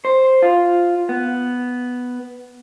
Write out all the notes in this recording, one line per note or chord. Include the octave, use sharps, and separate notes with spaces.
C5
F4
B3